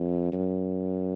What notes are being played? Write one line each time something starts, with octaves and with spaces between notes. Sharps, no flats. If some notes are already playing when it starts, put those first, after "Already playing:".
Already playing: F2
F#2